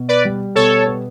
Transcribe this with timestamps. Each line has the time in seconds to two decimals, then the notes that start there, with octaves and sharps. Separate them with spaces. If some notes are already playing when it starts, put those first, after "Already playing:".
Already playing: B2
0.09 B4 D5
0.25 G3
0.55 B2 A4 C#5
0.86 B3